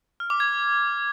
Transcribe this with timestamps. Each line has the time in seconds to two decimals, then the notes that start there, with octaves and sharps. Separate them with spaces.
0.20 F6
0.30 D6
0.40 G#6